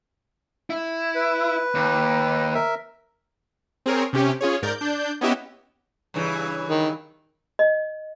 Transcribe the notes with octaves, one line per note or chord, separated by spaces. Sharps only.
E4
B4
D#2
A#4 E5
C4 G#4 A#4 C#5
C3 C#4 G4
C#4 F4 G#4 C#5
G#2 A#4 D5 G6
D4 G6
B3 C#4 D#4 E4 G4 E5
G2 C#3 E3
D#3
D#5